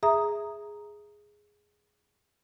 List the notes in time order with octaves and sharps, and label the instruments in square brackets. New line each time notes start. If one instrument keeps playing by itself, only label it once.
[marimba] G#4 E5 A#5 D#6